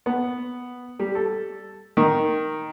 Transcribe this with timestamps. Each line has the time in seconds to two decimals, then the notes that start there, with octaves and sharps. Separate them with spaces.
0.06 B3
1.00 G3
1.15 A4
1.97 D#3